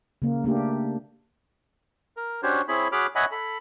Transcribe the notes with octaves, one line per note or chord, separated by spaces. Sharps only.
C#3 A#3
A3 A#3 D4 G4
A#4
C#4 D4 F#4 G4 C5 C#5
C4 E4 G#4 C#5 B5
F#4 G#4 C#5 B5 D6 F6
C#5 D#5 E5 F#5 G#5 B5
A4 B5